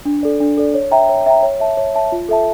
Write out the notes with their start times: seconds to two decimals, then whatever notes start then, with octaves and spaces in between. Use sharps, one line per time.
0.05 D4
0.23 A4 D5
0.40 D4
0.58 A4 D5
0.74 C#5
0.91 E5 G5 A#5
1.09 C#5
1.26 E5 G5 A#5
1.43 C#5
1.60 E5 A5
1.77 C#5
1.95 E5 A5
2.12 F4
2.29 A4 E5 A5